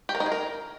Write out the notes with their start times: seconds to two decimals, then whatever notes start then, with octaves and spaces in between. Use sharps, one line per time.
0.09 G4
0.15 A#4
0.20 D#4
0.26 G#4
0.32 A#4